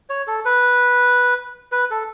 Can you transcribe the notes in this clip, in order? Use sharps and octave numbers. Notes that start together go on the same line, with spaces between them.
C#5
A4
B4
B4
A4